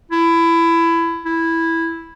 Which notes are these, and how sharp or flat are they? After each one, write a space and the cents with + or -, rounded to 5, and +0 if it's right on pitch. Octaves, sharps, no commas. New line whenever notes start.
E4 +20
E4 -5